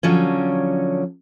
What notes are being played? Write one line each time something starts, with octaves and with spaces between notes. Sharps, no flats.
D3 F3 F#3 C#4